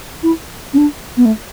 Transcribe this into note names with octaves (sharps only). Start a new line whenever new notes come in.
E4
C#4
D4
B3
A3